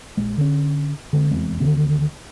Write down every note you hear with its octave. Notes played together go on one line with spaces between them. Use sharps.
A#1 G#3
D3 C#4
D3 G#3 C4
F1 E2 G#3 C4
D2 D3 D#3 C4